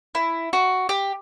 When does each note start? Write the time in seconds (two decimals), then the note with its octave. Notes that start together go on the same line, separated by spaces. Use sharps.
0.15 E4
0.53 F#4
0.89 G4